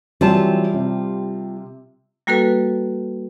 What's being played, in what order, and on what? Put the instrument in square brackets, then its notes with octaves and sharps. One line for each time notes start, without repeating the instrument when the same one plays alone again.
[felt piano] E3 F#3 C4 [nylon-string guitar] G3 F4 A5
[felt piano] C3
[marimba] G3 A#3 F#4 A4 B4